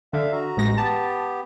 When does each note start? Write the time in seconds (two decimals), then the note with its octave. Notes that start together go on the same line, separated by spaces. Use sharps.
0.13 D3 E5 F5
0.32 F#4 A#5
0.57 A1 G#3 A#6
0.77 B3 G4 A5